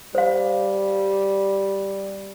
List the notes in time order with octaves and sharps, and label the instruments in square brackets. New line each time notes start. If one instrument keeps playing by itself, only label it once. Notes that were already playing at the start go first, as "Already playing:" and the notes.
[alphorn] G3 [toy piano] C5 F5